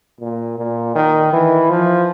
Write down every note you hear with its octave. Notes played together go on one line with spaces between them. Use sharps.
A#2
A#2
D#3
E3
F3